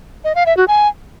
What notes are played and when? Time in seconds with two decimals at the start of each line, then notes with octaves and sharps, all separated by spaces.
0.24 D#5
0.35 F5
0.46 E5
0.57 F#4
0.68 G#5